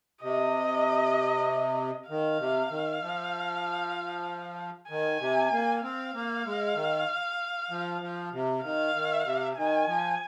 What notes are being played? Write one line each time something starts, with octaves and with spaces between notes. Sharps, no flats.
C3 D#5
D#3 F5
C3
D#3
F3
D#3 G#5
C3
A#3
C4 F5
A#3
G#3
D#3
F3
F3
C3
D#3 F5
D#3
C3
D#3 G#5
F3